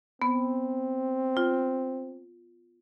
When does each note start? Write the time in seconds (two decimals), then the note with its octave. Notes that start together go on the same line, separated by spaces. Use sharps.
0.22 B3 C4
1.37 F4